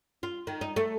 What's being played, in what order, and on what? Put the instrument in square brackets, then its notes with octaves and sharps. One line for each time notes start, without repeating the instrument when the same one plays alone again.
[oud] F4
D#3
D#4
A3